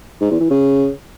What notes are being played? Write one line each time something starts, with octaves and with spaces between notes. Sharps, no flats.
G#2
E2
E3
C#3